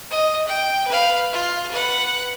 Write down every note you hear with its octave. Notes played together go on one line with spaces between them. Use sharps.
D#5
G5
B4 F5
F4
B4 F#5